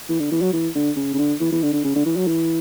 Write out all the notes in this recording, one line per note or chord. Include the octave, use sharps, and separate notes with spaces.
E3
D3
E3
F#3
E3
D3
C#3
C#3
D3
E3
E3
D3
D3
C#3
D3
E3
F#3
E3